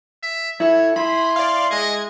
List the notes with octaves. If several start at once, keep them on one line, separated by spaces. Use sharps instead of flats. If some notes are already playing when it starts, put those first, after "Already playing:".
E5
E4 A4 C#5
E4 G#4 B5 C6
D5 F5
G#3 D#5 G#6